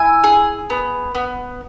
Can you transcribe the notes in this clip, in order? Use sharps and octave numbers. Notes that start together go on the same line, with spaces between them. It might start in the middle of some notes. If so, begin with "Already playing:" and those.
Already playing: E4 G#5
G#4
B3
B3